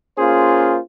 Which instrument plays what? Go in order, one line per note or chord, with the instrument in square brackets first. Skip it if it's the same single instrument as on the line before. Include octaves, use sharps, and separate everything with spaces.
[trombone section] A#3 C#4 F4 G#4 C5